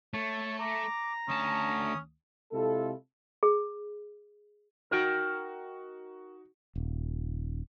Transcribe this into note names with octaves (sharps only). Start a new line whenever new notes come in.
A3 C#5 A5
A#5 D6
D2 C#4 A5 D#6
C3 G#3 E4 F4 A4
G#4
D#4 F#4 A#4 G5
D#1